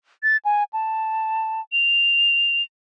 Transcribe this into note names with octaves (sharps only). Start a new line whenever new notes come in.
A6
G#5
A5
F7